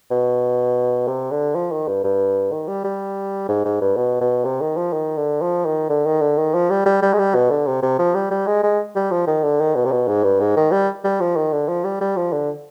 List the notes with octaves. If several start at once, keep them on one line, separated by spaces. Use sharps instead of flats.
B2
C3
D3
F3
D#3
G2
G2
D#3
G3
G3
G#2
G#2
G2
B2
B2
C3
D#3
F3
D#3
D3
F3
D#3
D3
D#3
D3
D#3
F3
G3
G3
G3
G#3
G3
B2
D3
C3
C3
F3
G3
G3
G#3
G#3
G3
F3
D#3
D3
D#3
B2
C3
B2
G#2
G2
G#2
D#3
G3
G3
F3
D#3
D3
F3
G3
G3
F3
D3